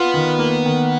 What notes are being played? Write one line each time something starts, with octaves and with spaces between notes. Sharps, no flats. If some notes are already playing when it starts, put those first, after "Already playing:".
Already playing: B3 F4
D#3
A#3
D#3